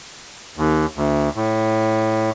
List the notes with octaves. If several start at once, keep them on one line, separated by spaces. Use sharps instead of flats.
D#2
D2
A2